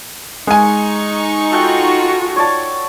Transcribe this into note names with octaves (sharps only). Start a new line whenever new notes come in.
G#3 D#4 G#5 C#6
F4 F#4 A4 F#5 G5
C#5 D5 A5